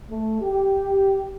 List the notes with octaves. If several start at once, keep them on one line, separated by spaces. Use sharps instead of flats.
A3
G4